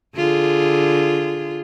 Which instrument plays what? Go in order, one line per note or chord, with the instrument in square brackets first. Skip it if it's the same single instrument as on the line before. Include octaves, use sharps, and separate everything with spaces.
[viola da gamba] D3 F4 G#4